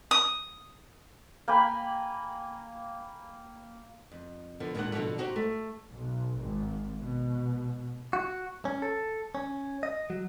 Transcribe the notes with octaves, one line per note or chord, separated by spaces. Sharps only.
D#6
A#3 G5 G#5 B5
F2
D3 F3 B3
D#2 A#2 G3 G#3 D4 F#5
B2 D3 D#3 F3 F#3 A3
D#4 F#4 G4 C5
A3
B1
G#1
B2
F#4
C#4
A4
C#4
D#5
F#3